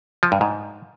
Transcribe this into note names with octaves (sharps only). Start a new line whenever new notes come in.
F3
G2
G#2